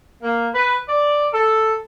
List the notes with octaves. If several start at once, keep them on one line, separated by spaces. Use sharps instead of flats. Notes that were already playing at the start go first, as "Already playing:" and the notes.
A#3
B4
D5
A4